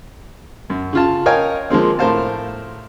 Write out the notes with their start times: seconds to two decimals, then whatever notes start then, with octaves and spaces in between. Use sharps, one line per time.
0.70 F#2
0.93 C#3 F4 A5
1.26 A#4 C#5 D#5 F5 G5 G#5
1.70 F3 G#3 A#3 C4
1.99 A2 A#4 C5 F5 A5